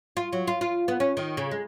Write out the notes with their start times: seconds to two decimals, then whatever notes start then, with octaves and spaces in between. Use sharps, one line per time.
0.17 F4
0.33 F#3
0.47 F4
0.61 F4
0.88 B3
1.00 C#4
1.17 D#3
1.37 C#3
1.51 G#3